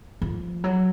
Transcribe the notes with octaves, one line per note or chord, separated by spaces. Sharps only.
F3
F#3